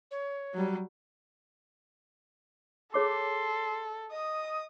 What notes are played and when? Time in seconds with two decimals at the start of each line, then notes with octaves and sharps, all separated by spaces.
0.11 C#5
0.54 F#3 G3
2.94 G#4 A4 C#5 C6 D6
4.12 D#5 D#6